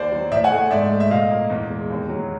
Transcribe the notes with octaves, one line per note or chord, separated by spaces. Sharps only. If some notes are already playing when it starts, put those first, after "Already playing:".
Already playing: D#2 C5 D5
F#3
A2 D5 E5
F#5 G#5
A3
G#2 D5 E5
A3
E5
A#2 D#5 F5
A#3
E2
G#3
D#2
F#3